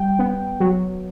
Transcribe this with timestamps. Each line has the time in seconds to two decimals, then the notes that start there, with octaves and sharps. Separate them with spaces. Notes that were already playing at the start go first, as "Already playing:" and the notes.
Already playing: G3 G5
0.19 B3
0.60 F#3